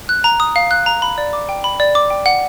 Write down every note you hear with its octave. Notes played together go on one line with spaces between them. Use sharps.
F#6
A#5
D#6
F5
F#6
A#5
B5
D5
D6
G5
B5
D5
D6
G5
F#5